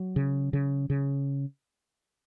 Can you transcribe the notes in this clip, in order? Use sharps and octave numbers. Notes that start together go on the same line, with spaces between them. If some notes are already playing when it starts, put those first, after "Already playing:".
Already playing: F#3
C#3
C#3
C#3